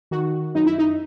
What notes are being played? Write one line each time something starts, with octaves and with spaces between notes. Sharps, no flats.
D#3 F#4
F#2 D#4
E4
D#4